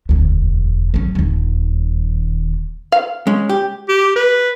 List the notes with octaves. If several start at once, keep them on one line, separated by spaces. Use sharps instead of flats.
E1 D2
F#3 C#4
D#1 D#2
F5
G#3 C#4
G4
G4
B4